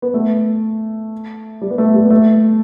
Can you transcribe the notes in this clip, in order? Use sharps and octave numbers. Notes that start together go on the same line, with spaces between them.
B3
A3
G3
B3
A3
G3
B3
A3